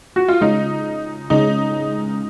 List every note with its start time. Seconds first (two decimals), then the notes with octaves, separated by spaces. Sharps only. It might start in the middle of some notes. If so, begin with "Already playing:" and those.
0.16 F#4
0.28 F4
0.41 C#3 G#3 C#4 D#4
1.30 C#3 G#3 C#4 D#4